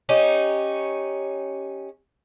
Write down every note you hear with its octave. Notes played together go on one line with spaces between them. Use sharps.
C#4 D#4 G4